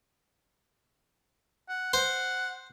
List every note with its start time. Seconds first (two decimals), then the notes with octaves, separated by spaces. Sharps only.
1.68 F#5
1.93 C5 F#5